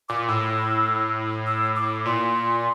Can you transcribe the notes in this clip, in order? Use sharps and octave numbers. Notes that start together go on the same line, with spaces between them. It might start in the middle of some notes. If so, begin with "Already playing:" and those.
A#2 D6
A2 E6
E6
D6
A#2 C6